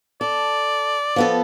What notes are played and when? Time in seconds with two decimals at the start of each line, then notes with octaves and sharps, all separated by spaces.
0.21 A4 D5
1.16 F3 B3 A4